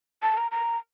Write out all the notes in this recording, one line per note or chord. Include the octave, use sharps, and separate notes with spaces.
A5
A#5
A#5